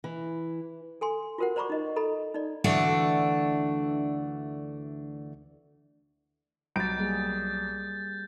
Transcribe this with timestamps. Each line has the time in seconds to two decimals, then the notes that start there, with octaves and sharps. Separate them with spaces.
0.04 E3
1.01 A4 G#5 C6
1.38 F4 F#4 A#4 C5 F#5
1.56 C5 D5 A#5 B5 C#6 D6
1.70 D#4 D#5
1.96 A4 D#5 A#5 B5
2.34 D#4 D5
2.64 D2 E3 A3 D4 F#4 F#5
6.76 B1 G3 G6 A6 D7
6.98 G3 A#3 G#4